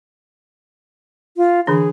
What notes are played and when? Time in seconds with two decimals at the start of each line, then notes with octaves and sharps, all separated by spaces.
1.37 F4
1.67 D3 E3 D4 G#4